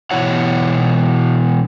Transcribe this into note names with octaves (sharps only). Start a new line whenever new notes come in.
B2 E3 E4 C#5 F#5